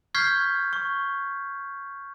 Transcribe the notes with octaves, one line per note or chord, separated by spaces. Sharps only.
C#6 F6 G6 G#6 B6 C7
C#6